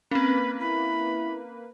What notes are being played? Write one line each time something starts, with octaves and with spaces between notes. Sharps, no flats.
A#3 C4 C#4 B4 B5
E4 B5